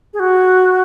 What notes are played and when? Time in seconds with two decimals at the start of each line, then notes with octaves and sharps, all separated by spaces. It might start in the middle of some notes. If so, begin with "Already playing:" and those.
0.14 G#4
0.20 F#4